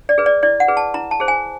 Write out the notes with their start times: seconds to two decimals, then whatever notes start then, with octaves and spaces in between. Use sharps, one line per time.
0.09 D5
0.18 G#4 B4
0.26 D5
0.43 E4 D5
0.60 F#5
0.68 G#4 B4
0.77 A5
0.94 E4 A#5
1.11 A5
1.20 G#4 C5
1.28 G#5